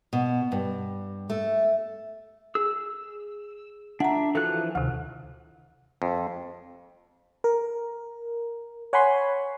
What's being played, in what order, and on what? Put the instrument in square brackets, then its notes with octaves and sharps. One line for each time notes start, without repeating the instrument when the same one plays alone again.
[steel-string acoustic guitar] B2
G2
A3
[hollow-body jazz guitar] G#4 [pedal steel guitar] E6
[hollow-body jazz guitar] C#2 [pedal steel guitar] D4 E5 [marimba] F#5 A#5
[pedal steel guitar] E3 F3 F#6 [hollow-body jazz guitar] F4 F#4 A4
[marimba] D2 C3 [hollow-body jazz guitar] D#3
[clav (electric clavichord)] F2
[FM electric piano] A#4
C#5 F#5 G#5 B5 C6